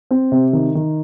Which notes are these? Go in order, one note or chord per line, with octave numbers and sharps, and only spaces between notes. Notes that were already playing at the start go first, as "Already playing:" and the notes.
C4
C3
D#3
D#3